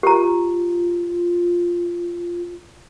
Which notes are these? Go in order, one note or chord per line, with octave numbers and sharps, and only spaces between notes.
F4 G4 A#5